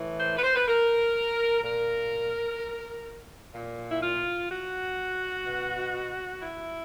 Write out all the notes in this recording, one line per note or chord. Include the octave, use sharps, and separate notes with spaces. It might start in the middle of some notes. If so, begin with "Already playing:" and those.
Already playing: A2 E3
C5
B4
C5
B4
A#4
A#2 A#4
A#2
E4
F4
F#4
B2
E4